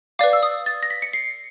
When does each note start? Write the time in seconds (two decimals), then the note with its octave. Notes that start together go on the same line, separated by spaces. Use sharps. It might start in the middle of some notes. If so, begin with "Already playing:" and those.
0.19 B4 D5 F5 D6
0.33 E6
0.43 D#6
0.66 A6
0.83 A#6
0.90 B6
1.02 C#7
1.13 C7